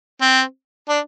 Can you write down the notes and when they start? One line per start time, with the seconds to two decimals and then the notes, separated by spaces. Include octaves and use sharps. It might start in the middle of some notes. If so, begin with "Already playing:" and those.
0.21 C4
0.89 D4